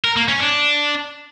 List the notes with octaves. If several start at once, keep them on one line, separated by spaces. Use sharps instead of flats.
A#4
A#3
C#4
D4